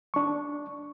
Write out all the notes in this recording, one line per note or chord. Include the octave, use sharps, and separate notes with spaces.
D4 C#6